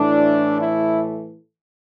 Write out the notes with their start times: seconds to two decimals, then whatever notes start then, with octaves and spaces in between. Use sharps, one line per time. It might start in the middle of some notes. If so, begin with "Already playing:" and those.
Already playing: A2 E3 A3 D4
0.61 E4